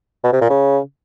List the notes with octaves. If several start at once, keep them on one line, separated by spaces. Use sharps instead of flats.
B2
C3
A#2
C#3